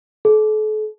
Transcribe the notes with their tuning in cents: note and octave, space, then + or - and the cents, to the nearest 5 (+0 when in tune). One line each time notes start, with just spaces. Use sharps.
A4 -40